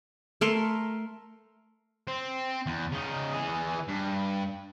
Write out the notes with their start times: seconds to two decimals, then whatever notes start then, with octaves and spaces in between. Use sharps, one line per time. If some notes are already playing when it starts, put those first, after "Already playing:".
0.41 A3 A#4 C6
2.07 C4
2.66 E2
2.92 C#3 D#4
3.33 E3 G#4
3.88 G2